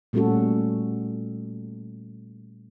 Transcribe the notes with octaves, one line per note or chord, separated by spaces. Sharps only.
A#2 G3 A3 C#4 F#4 A4